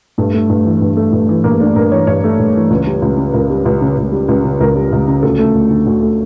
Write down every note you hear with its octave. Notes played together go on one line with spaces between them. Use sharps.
G2 A3
A3
G2
E3
G2
A3
G2
E3
G2 A#3
A3 D4
G2 A#4
E3 C#5
G2 C#5
A3
G2
E3
C#2
G3
C#2
C#3
C#2 A#4
G3
C#2
C#3
C#2
G3
C#2
C#3
C#2 A#4
G3
C#2
C#3
D2 A4
A3
D2
D3
D2
A3